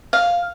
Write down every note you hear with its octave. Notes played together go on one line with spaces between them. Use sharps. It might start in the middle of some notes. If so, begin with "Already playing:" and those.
F5